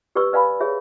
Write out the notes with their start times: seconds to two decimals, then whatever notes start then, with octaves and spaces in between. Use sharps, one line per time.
0.15 G4 B4 D5 C#6 E6
0.33 B4 D5 F5 G#5 B5
0.60 G#4 C#5 E5